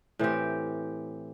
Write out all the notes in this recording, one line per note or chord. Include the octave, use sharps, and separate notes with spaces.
A2 E3 C4 G4